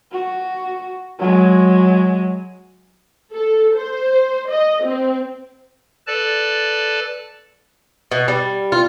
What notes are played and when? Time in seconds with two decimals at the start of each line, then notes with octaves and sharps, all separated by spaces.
0.12 F#4
1.19 F#3 G#3
3.33 A4
3.76 C5
4.49 D#5
4.84 C4
6.07 A4 B4 D5 A5
8.12 B2
8.28 G3
8.72 F4